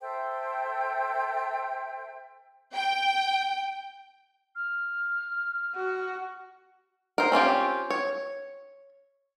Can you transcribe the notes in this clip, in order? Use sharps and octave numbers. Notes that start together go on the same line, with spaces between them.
A4 C5 E5 G5
G5
F6
F#4
A#4 C5
C4 C#4 F4 G4
C#5